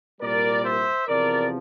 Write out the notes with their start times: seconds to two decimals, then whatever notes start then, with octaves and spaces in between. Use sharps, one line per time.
0.21 C2 A#2 G3 A#4 D5
0.64 C5 E5
1.08 E2 C3 F3 A#4 D5